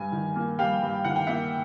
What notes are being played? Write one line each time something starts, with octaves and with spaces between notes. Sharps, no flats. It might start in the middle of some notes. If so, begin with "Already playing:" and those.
Already playing: G2 G3 G#5
D#3
A#3
G3 F5 G5
G2
D#3 F#5
G5
A#3 E5 F#5